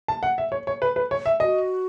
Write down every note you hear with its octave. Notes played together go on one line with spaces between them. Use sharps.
A5
F#5
E5
C#5
C#5
B4
B4
C#5
E5
F#4 D#5